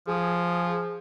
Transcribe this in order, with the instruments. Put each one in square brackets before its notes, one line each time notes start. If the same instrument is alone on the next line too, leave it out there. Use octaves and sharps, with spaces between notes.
[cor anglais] F3 [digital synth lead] G#4